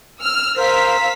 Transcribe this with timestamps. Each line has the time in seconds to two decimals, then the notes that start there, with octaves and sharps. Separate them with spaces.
0.20 E6 F6
0.57 A#4 C5 F5 E6 B6